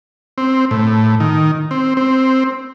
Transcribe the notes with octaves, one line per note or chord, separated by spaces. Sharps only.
C4
A2
D#3
C4
C4